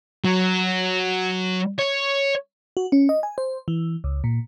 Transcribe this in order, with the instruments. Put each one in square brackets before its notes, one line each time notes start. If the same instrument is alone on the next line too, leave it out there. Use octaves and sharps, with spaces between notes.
[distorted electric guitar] F#3
C#5
[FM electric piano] F#4
C#4
D#5
G#5
C5
E3
C#2
A#2